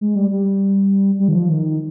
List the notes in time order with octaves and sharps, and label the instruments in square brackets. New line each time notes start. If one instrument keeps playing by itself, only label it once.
[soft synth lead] G#3
G3
G3
G3
D#3
F3
D#3